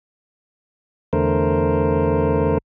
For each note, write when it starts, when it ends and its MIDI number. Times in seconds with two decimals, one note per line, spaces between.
1.13 2.58 40
1.13 2.58 50
1.13 2.58 57
1.13 2.58 70
1.13 2.58 72